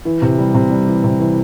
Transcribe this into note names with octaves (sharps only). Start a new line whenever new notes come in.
E3
C3
G3
C3
G3
E3
C3
E3